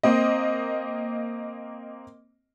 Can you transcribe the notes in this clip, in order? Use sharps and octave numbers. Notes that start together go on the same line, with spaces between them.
A#3 C4 D#5